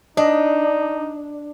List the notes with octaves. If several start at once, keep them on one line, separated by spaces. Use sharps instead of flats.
D4 D#4 D#5